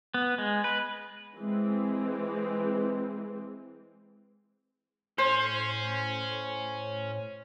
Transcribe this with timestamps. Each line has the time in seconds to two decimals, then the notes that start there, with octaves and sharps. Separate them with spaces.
0.14 B3
0.38 G#3
0.64 B4
1.36 E3 G#3 C4
5.18 A2 C#4 C5